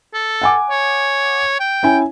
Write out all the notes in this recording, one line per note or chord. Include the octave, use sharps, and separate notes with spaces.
A4
F#5 G#5 D6
C#5
G5
C#4 E4 G#5